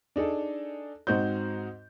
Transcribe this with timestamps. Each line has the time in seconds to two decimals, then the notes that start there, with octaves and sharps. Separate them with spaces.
0.16 D4 D#4 G#4 A4
1.07 G#2 C4 D#4 F#4 C5 G6